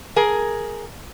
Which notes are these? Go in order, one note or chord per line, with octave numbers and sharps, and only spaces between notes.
G#4 A#4